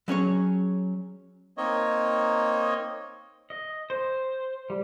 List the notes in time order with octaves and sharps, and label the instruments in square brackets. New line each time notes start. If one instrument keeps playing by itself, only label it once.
[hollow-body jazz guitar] F#3 C#4 G#4 C#5
[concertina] A#3 C4 D#4 C#5 D#5
[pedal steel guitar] D#5
C5
G3